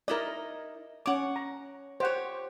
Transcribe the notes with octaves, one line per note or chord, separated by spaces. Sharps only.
D#4 E4 A#4 D5 D#5
C#4 C#5 F#5 D6
A#5
G4 C5 C#5 F#5